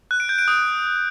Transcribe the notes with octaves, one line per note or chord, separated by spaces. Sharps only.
F#6
D7
G6
D7
D#6